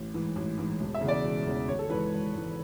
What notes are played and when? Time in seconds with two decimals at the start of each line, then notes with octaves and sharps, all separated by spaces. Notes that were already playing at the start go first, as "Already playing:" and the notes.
Already playing: A1
0.14 G#2 E3
0.36 A1
0.58 G#2 E3
0.80 E1
0.94 E5
1.01 E2 C#3
1.08 D5
1.24 E1
1.45 E2 C#3
1.68 G#1 C#5
1.79 A4
1.90 G#2 E3 B4
2.11 G#1
2.33 G#2 E3